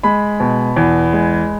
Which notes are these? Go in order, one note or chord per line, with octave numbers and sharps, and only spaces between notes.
G#3 B5
B2
E2
G#3